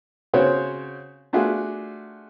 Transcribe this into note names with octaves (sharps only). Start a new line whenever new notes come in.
C#3 C4 F#4 C5 C#5
A3 D4 F4 F#4 G#4